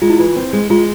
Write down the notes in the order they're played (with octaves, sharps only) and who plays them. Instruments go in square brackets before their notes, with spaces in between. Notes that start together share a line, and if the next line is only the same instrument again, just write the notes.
[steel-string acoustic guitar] G#3 [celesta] F4
[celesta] E4
[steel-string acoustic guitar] E3 [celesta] F4
[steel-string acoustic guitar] C4
G#3
[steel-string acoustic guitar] G#3 [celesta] F4